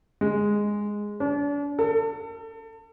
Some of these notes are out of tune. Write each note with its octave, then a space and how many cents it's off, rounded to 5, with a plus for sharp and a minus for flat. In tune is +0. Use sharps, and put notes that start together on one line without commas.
G#3 -5
D4 -40
A4 +30